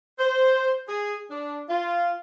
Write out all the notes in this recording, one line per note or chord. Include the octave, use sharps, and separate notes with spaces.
C5
G#4
D4
F4